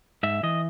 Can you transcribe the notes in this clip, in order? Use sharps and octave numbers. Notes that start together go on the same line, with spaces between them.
G#2 E5
E3 D#5